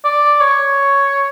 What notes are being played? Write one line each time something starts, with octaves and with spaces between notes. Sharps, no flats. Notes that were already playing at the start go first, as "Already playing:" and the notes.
D5
C#5